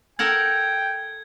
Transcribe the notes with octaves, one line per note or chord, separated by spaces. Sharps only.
A4 A#4 F#5 G5 G#6